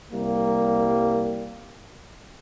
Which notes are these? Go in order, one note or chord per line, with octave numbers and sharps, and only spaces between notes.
C2 G3 A#3